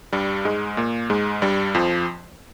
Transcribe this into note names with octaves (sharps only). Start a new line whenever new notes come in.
G2 G3
G#2 G#3
A#2 A#3
G#2 G#3
G2 G3
F2 F3